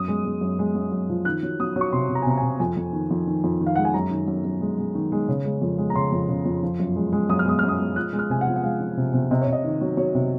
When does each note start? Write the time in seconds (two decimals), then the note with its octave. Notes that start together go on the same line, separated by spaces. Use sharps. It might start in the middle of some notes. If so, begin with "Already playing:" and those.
Already playing: F#2 D#6
0.08 G#3
0.25 G#3
0.41 F#2
0.59 G#3
0.75 F#2
0.92 F#2
1.09 F3
1.25 D#3 F#6
1.43 F#3
1.60 F#3 D#6
1.76 F#3
1.81 C#6
1.93 C3 C6
2.09 C3
2.15 A#5
2.22 G#5
2.26 C3 A#5
2.38 G#5
2.43 C3
2.60 F2 G#5
2.77 F2
2.93 D#3
3.11 F2
3.27 D#3
3.44 F2
3.60 D#3
3.66 F5
3.76 G#3 F#5
3.85 G#5
3.94 F#2 A#5
4.11 D#3
4.28 F#2
4.45 F#2
4.61 G#3
4.78 G#3
4.95 D#3
5.12 G#3
5.29 C#3
5.45 G#3
5.62 F2
5.78 G#3
5.90 A#5
5.95 C#3 C6
6.12 F2
6.29 C#3
6.46 F2
6.63 F3
6.80 F#2
6.96 G#3
7.13 G#3
7.29 F#2 D#6
7.39 F6
7.46 G#3 D#6
7.59 F#2 F6
7.69 D#6
7.79 G#3
7.96 F3 F#6
8.13 G#3
8.19 F6
8.30 C3 G#5
8.41 F#5
8.47 F3
8.56 F#5
8.63 G#3 F5
8.81 F3
8.97 C3
9.13 C3
9.31 C3 D#5
9.42 C#5
9.47 C3
9.53 D#5
9.64 D#3
9.81 F#3
9.97 F#3 C#5
10.15 C3